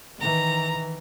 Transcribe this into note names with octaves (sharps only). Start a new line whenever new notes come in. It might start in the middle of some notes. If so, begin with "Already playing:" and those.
D#3 E3 A#5